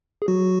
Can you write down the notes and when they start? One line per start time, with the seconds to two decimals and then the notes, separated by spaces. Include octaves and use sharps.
0.22 G#4
0.28 F#3 F#4